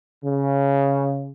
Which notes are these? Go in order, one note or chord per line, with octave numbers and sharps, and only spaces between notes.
C#3